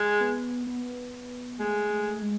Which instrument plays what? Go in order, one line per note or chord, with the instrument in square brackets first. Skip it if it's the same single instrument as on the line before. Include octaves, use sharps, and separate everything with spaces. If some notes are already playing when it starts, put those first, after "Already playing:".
Already playing: [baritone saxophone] G#3
[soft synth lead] B3
B3
[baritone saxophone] G#3 [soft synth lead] A3
[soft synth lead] A3
G#3